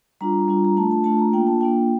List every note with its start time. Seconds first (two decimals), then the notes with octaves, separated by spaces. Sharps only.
0.21 G3 D4 F4 A#5
0.48 G3 D4 F4
0.64 A#5
0.77 A3 D4 F4 A5
0.91 A5
1.04 A3 D4 F4 A5
1.19 A#5
1.33 A#3 D4 F4 G5
1.47 A5
1.61 A#3 D4 F4 G5